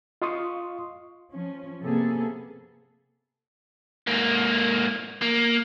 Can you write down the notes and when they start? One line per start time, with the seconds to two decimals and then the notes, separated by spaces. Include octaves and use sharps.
0.22 F4 D#5 F5 C6 C#6 D#6
1.32 F3 C#4
1.83 C3 A#3 B3 G#4 A4
4.07 G#2 A#3
5.22 A#3